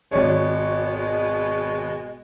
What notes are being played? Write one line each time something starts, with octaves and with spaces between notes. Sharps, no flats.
G#1 B2 G#3 D4 C#5